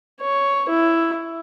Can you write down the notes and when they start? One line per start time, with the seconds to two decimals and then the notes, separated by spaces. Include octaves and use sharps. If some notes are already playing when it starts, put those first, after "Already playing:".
0.21 C#5
0.69 E4